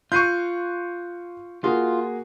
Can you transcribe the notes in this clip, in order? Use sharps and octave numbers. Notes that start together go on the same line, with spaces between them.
F4 C#6 F#6 G6 C7 D#7
A#3 F4 F#4 G#4